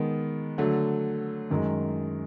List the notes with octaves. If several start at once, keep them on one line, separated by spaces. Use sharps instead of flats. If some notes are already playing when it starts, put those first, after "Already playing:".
Already playing: D#3 G#3 B3
D3 F#3 A3
F#2 D#3 G#3